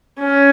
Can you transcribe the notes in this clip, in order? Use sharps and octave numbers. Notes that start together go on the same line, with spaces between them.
C#4